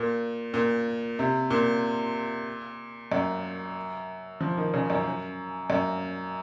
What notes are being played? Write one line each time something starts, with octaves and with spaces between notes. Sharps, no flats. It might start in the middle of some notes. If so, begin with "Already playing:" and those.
Already playing: A#2
A#2
C3
A#2
F#2
F3
D#3
C#3
F#2
F#2